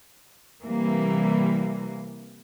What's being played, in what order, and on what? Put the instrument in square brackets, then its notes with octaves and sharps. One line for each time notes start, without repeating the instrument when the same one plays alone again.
[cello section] C3 E3 G3 A#3